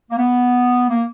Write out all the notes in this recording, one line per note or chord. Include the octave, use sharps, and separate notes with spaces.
A#3
B3
A#3